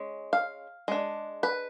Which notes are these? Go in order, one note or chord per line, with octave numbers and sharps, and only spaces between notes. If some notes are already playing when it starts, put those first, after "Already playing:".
Already playing: G#3 C#4
F5
G#3 D4
B4